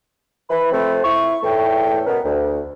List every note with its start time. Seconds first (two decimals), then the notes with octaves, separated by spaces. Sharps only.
0.50 E3 B5
0.72 F3 A3 C4
1.04 E4 C#6
1.43 E2 A2 A3 G5
2.06 B2 B3 C#4 A#4
2.24 D2